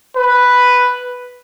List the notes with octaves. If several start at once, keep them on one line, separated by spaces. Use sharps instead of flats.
B4